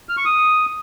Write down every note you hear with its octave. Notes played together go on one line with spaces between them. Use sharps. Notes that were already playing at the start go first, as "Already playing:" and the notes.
F6
C#6
D#6